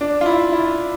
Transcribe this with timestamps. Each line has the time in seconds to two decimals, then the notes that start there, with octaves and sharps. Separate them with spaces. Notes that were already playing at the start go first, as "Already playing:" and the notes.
0.01 D4
0.21 F4
0.26 E4
0.53 E4